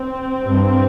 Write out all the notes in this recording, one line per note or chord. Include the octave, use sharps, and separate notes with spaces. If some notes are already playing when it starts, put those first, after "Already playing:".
Already playing: C4
G2